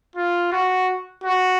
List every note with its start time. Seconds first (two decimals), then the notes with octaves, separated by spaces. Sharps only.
0.16 F4
0.52 F#4
1.24 F#4